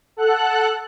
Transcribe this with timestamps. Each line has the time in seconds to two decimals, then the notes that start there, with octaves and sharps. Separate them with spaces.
0.17 A4 F#5 F#6